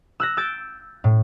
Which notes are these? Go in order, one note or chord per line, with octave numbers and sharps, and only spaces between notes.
E6 F#6 A#6
E6 G6 A6 D7
A2